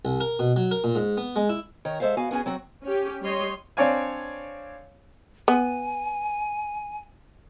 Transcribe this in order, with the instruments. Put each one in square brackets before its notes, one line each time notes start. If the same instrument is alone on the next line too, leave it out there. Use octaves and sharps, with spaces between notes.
[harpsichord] C2
A#4
B2
F#3
A#4
A#2
G#2
B3
G#3
E4
[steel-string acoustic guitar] D#3 A#4 C#5
G#3 A4 C5 E5 F5
B3 F#4 F5 G#5
B3 C#4 F#4 G#4 G#5
F#3 C4 F#4
[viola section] C#4 G4
G3 C#5 D#5 C6
[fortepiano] C4 D4 C#5 D5 F5 G#5
[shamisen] B3 [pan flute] G#5